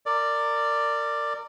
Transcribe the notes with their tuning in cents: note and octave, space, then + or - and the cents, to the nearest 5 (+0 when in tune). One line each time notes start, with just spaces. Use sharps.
A#4 -25 D5 +5